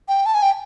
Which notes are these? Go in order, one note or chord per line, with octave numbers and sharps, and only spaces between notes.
G5
A5
G#5
G5